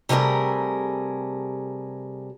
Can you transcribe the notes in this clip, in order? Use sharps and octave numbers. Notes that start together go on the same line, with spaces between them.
C3 G3 A3 G#4 A#4